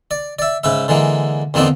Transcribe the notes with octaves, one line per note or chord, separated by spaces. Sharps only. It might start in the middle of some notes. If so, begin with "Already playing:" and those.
D5
D5 E5
G#2 C#3 B4 E5
D3 E3 G#3 A#3
E2 D3 A#3 C4 D4 D#4